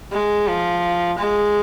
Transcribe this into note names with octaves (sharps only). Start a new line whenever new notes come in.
G#3
F3
G#3